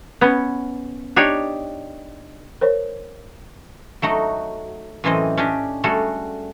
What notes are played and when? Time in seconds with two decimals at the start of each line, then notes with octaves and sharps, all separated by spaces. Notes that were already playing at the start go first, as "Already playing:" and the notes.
0.21 B3 C#4
1.16 D4 D#4 G4 C#5
2.61 A#4 C5 C#5
4.02 F#3 A3 D#4 F#4
5.04 F#2 A2 E3 C4 D#5
5.37 C#4 D4 G4 D#5
5.84 G3 A3 F#4 G#4 A4